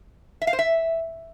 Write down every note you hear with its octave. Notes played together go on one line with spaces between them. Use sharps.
E5
F5
C5
E5